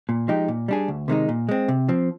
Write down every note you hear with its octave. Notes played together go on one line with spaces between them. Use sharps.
A#2
F3 G#3 D#4 G4
A#2
G3 D4 G#4
D2
C3 D#3 G#3 D#4
A#2
G#3 C4
C3
F3 C4